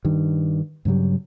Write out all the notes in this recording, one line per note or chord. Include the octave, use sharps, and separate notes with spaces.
G2 D#3
G2 C#3 F#3 G3